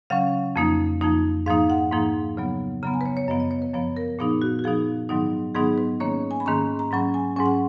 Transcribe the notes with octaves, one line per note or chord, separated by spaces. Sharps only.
C#3 F#3 C#4 F5
F2 F3 A#3 D#4
F2 F3 A#3 D#4
G#2 F3 A#3 D#4 F5
F#5
G#2 F3 A#3 D#4
C#3 F#3 B3
C#3 F#3 B3 A#5
G#5
B4
C#5
C#5
F#2 F3 B3 D#5
D#5
C#5
B4
F#2 F3 B3 C#5
A#4
A#2 F3 B3 D#4 G#4
F#4
F#4
A#2 F3 B3 D#4 G#4
G#2 D#3 F#3 B3 D#4
G#2 D#3 F#3 B3 D#4 G#4
B4
G#2 D#3 A#3 C#4 C#5
G#5
B5
G#2 D#3 A#3 C#4 A#5
A#5
G#2 F#3 C#4 B5
G#5
G#2 F#3 C#4 G#5
F#5